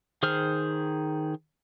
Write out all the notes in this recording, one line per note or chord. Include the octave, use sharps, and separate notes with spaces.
D#3 G#4 C5 F6